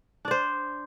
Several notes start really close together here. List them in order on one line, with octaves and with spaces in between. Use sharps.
D4 D5 C5